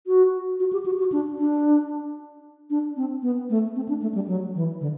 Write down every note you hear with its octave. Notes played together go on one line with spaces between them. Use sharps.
F#4
F#4
G4
F#4
F#4
D4
D4
D4
C4
B3
A3
C4
D4
A3
G3
F#3
E3
D3